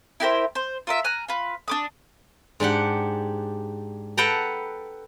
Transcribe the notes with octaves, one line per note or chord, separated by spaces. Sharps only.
E4 G4 A#4 C5
C5
F4 A#4 E5
G#5 A#5 F6 F#6
F4 B4
D4 D6 D#6
G#2 D4 G4 F#5
A4 B4 F#5 G5 A5 A#5